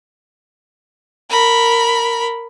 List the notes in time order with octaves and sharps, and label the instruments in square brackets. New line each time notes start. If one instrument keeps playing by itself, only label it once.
[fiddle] A#4 B5